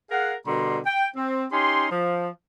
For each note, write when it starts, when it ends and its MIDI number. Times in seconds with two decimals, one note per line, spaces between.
0.11 0.34 68
0.11 0.34 70
0.11 0.34 77
0.11 0.34 78
0.46 0.79 47
0.46 0.79 50
0.46 0.79 55
0.46 0.79 70
0.46 0.79 82
0.46 0.79 84
0.86 1.06 79
1.16 1.45 60
1.52 1.86 61
1.52 1.86 63
1.52 1.86 67
1.52 1.86 80
1.52 1.86 84
1.91 2.29 53